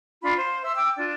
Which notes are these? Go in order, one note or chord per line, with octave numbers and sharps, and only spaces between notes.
D4 F4 B5
C5 F5
E5 C6 E6
G5 D6 E6
D4 F4